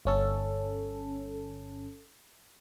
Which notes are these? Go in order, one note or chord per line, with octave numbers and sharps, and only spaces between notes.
G1 C#4 A4